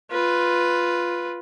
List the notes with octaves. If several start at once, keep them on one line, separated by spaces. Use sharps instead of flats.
F4 B4